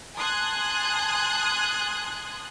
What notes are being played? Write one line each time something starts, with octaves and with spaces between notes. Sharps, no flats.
G#5 A5 C6 D#6 F#6 G#6